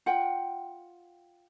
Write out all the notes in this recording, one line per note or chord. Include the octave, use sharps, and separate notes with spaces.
F4 F#5 G5